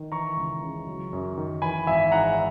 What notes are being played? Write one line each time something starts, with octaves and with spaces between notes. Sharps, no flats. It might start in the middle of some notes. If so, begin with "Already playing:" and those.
Already playing: D#3
E3 A#5 C#6
C#2
C#3
F#3
F#2
D#3
E3 G#5 B5
G#1 E5 G#5
G#2 F#5 A#5